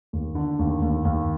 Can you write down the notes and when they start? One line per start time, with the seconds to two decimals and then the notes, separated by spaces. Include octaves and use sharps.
0.13 D#2
0.35 D3
0.59 D#2
0.82 D#2
1.05 D#2